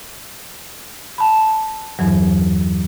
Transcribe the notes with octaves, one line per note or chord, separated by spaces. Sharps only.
A5 B5
E2 G2 E3 F#3